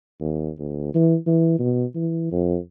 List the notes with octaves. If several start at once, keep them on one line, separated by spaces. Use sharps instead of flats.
D#2
D2
E3
E3
B2
E3
F2